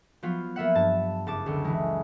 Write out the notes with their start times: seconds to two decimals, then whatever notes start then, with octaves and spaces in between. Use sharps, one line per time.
0.23 F3 F#3 B3 F4
0.56 A#3 B3 E5 F#5
0.75 G2 A5
1.27 F#1 A5 D6
1.46 C#2 D3
1.65 E3 G#3